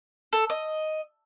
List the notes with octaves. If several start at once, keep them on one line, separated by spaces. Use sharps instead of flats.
A4
D#5